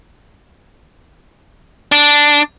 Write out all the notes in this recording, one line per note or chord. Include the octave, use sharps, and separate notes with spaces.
D4